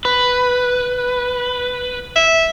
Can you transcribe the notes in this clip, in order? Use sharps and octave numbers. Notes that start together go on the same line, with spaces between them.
B4
E5